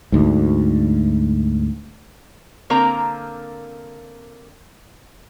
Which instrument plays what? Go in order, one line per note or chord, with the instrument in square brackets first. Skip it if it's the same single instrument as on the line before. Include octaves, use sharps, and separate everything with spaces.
[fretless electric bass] D2 G#2
[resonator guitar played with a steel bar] D3 A#3 C4 A#4 A#5